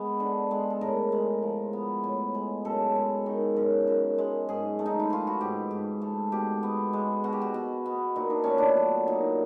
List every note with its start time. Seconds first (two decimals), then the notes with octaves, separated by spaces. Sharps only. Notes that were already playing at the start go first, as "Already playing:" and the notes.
Already playing: G#3 B3
0.20 D3
0.51 G#3
0.70 A4
0.81 A2 A#4
1.12 G#3
1.43 F3
1.73 B3
2.04 A2
2.35 G#3
2.65 F#2 A4
2.95 G#3
3.26 D#3
3.56 F#2
3.87 F#2
4.18 G#3
4.49 G#2 G#4
4.79 A3
4.86 D#4
5.00 E4
5.10 E3 F4
5.27 F#4
5.41 G#2 G4
5.71 G#2
6.02 A3
6.32 B2 G4
6.63 B3
6.93 G#3
7.24 B2 F#4
7.33 G4
7.42 F#4
7.54 B2
7.86 B3
8.16 A#2 D#4
8.30 D4
8.44 A3 C#4
8.58 D4
8.77 F#3
9.07 A#2 D#4